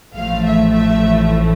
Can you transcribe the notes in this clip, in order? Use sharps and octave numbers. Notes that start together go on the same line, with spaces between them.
A1 A2 F3 A3 F5
E5
E5